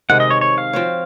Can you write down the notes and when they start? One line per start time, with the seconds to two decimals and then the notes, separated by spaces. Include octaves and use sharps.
0.09 C3 D#3 G#3 F#5
0.20 D#5
0.31 C#5
0.41 C#5
0.58 F5
0.73 F3 C4 F#4 C#5